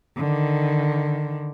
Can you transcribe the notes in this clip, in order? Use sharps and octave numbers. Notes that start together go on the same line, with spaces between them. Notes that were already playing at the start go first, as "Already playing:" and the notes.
D3 D#3